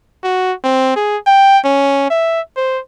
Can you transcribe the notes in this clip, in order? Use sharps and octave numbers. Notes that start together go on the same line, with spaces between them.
F#4
C4
G#4
G5
C#4
E5
C5